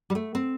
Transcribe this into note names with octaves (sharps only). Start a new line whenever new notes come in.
G3
A3
C4